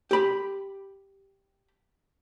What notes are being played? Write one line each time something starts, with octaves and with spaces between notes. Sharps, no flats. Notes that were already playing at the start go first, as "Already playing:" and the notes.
G4 B5